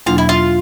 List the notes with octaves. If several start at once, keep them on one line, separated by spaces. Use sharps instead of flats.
E2 B2 F#3 A#3 D4 F4
E4
F4